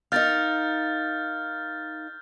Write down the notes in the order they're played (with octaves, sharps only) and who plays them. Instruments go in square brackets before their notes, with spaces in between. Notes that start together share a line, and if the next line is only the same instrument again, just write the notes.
[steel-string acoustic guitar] D#4 A#4 F5 [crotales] F6 G6 A6